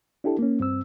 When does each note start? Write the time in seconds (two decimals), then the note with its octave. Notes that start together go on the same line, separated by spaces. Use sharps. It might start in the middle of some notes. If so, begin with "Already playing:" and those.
0.24 D4 E4 G4 A4
0.39 A#3 C#4
0.60 G2 C4 E6